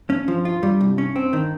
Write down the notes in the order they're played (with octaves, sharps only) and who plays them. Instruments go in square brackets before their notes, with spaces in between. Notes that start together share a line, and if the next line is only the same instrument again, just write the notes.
[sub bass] G2 [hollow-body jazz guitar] C#4
[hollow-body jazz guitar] F3
F4
[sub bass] G2 [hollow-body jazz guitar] G3
[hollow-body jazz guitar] C2
C#4
C4
D#3